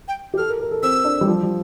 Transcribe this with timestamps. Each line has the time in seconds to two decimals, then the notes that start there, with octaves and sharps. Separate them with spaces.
0.08 G5
0.34 G4
0.37 A4 F6
0.49 A#4
0.61 A#4
0.71 A4
0.83 C4 E6
1.05 D4
1.21 G3
1.28 F3
1.43 G3